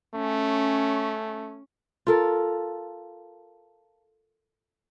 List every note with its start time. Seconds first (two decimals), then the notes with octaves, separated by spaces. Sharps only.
0.15 A3 C#4
2.07 F4 A4 A#4